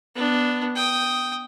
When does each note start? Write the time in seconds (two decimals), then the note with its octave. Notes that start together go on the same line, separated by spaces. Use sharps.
0.15 B3 D4
0.75 G5 D#6